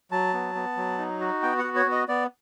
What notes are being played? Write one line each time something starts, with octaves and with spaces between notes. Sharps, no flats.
F#3 A5
B3
B3
F#3
D#4
F#4
B3 G5
F#5
F#4
C#5
B3
D#5
B3 D5